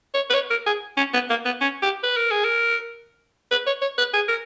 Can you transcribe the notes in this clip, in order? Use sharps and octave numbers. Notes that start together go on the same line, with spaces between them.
C#5
B4
C#5
A#4
G#4
C#4
B3
A#3
B3
C#4
G4
B4
A#4
G#4
A#4
B4
C#5
C#5
B4
G#4
A#4